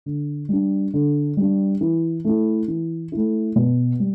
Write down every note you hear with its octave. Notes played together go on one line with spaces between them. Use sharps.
D3
G3 D4
D3
G3 D4
E3
A3 E4
E3
A3 E4
B2
G3